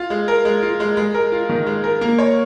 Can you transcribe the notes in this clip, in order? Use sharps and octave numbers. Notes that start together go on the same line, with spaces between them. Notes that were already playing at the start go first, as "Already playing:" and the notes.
Already playing: F4
G#3
A#4
G#3
F4
G#3
G#3
A#4
F4
D#3
G#3
A#4
A#3
C#5